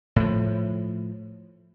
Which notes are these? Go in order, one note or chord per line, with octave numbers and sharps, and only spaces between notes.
A2 F3